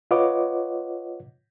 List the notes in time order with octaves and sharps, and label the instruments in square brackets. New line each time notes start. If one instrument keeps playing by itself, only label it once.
[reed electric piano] F4 B4 C#5 D#5 F#5 D6